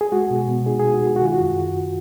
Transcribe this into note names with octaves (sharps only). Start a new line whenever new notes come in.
G#4
G#3 F#4
B2
B2
D#4 G#4
G#4
G#3
F#4
B2 G#4
F#4
D#3 F4
F#4
F#2